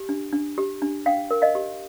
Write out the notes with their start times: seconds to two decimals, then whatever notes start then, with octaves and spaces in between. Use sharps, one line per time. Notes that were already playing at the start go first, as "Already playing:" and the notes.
Already playing: G4
0.09 D4
0.33 D4
0.58 G4
0.82 D4
1.06 D4 F5 G5
1.31 A#4
1.42 D#5 F5
1.55 G4